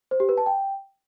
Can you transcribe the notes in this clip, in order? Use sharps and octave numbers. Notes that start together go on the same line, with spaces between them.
C5
G4
B4
A5
G5